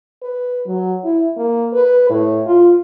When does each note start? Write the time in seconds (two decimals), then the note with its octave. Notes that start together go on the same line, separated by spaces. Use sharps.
0.23 B4
0.67 F#3
1.04 E4
1.37 A#3
1.74 B4
2.10 A2
2.47 F4